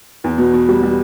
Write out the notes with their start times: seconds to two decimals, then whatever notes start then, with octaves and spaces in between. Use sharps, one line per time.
0.24 E2
0.38 B2
0.54 B2
0.68 G3
0.83 G3